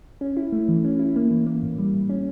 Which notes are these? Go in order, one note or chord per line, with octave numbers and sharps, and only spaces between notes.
C#4
E4
A3
E3
C#4
E4
A#3
E3
A#3
A2
G3
A2
C#4